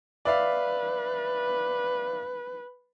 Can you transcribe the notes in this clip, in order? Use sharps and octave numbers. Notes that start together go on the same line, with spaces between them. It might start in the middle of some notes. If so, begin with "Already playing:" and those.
B4 D5 E5 F5